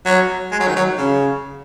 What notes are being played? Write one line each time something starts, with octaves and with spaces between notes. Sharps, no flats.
F#3
G#3
F#3
D#3
F#3
C#3